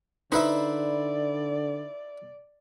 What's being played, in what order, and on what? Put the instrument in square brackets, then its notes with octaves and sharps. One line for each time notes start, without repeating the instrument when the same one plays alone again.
[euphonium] D3 [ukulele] D#4 [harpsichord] E4 B4 C5 [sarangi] D5